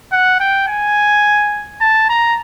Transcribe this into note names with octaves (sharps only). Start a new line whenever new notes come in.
F#5
G5
G#5
A5
A#5